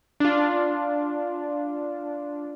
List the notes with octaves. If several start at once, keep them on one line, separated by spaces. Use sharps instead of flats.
D4 F4